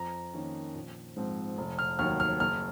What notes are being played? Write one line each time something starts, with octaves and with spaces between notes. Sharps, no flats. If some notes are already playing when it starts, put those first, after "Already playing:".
Already playing: F2 A#5
D#3 A#3 C#4
A#1
G#2 F3 C4
F1
F6
D#2 D#3 F#3 F6
F6
F#1 F6